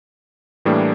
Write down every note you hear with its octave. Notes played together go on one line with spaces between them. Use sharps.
A2 E3 G3 A#3 D4